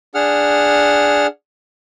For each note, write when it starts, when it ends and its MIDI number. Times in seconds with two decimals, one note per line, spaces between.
0.15 1.27 62
0.15 1.27 68
0.15 1.27 78
0.15 1.27 89